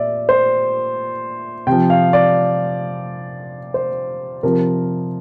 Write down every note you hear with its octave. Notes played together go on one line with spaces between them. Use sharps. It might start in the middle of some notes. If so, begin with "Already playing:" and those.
Already playing: A#2 D5 E5
C5
C3 F3 G5
F5
D5
C5
C3 F3 A#4